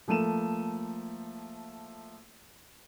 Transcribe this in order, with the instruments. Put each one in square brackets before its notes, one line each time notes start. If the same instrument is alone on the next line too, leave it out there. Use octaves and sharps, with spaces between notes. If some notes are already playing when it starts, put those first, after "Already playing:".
[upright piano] F3 A3 A#3 D#7 E7